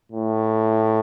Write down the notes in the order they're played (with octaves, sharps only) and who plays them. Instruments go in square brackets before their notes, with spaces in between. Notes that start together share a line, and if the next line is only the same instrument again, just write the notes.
[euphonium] A2